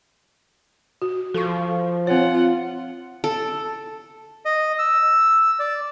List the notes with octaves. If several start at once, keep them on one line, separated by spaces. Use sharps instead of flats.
F#4
F3 A4 C#6
C4 F4 C#5 F#5
A4
D#5
E6
D5